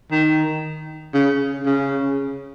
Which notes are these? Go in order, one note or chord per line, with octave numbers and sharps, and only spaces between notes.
D#3
C#3
C#3